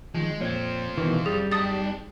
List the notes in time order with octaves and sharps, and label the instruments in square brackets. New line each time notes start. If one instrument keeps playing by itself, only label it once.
[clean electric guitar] D#3 F3 [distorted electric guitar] G#3
[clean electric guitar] F2 A#2 C#5 [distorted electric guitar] F3 C4
[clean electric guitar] C2 [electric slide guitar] B2 D#3 E3
[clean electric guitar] F#2 [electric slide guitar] G3 [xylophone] G#4
[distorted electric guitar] D#4 A5 [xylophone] D#6 A6